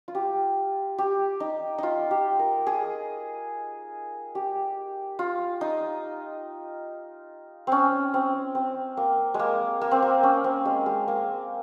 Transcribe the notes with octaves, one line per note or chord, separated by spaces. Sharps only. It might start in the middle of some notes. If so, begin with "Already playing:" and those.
F4
G4
G4
D#4
D#4 F4
G4
A#4
G#4
G4
F4
D#4
C4 C#4
C4
C4
A#3
G#3
A#3
A#3
C4
A#3
C#4
C4
G#3
G#3
A#3